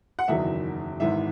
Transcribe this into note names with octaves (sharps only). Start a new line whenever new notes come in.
F#5
F#1 E2 D#3 F#3 E5
G#1 G#2 E3 E5